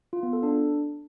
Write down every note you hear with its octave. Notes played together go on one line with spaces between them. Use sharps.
F4
B3
A4
D4